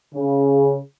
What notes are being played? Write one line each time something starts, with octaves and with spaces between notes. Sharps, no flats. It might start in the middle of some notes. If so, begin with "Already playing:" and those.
C#3